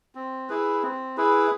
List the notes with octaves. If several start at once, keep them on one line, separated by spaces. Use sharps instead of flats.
C4
E4 G#4 B4
C4
E4 G#4 B4